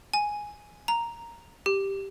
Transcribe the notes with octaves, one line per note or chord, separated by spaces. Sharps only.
G#5
A#5
G4